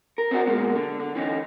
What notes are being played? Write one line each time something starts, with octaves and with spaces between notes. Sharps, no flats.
A#4
C4 D4 E4 F#4
B2 G#3 A#3
D3
D3
E3 C#4 D#4